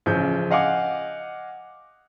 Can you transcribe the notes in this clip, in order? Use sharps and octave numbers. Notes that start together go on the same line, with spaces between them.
A1 C#3 F3 G6
D#5 F5 F#5 G#5 D6